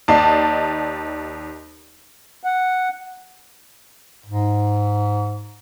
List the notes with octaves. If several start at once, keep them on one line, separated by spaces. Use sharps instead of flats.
D#2 D5 D#5 A5 C7
F#5
G#2